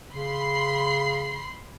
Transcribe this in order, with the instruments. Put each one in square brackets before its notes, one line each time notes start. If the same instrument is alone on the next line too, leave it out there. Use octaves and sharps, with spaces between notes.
[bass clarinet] C#3 [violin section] B5 C6 C7